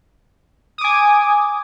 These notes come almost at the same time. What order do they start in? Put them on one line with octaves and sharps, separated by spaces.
D#6 D6 G#5